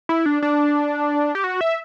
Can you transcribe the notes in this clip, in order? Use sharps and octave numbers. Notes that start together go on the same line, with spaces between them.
E4
D4
D4
G4
F#4
E5